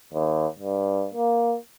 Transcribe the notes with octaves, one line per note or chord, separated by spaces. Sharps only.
D#2
G2
A#3